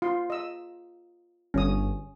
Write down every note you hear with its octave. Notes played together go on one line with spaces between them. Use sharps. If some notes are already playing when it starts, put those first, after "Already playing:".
F4 C6
D#5 E6
G1 C#4 D#6